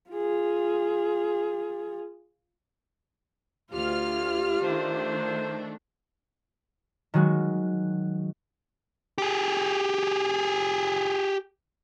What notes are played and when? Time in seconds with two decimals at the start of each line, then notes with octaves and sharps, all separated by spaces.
0.11 F4 G#4
3.72 D2 F4 G4 F6
4.63 D#3 A3 D4 C5
7.14 D#3 F#3 G#3 F#4
9.18 G4 G#4